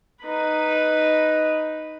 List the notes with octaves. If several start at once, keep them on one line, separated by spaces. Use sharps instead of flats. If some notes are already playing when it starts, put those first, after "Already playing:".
D#4 B4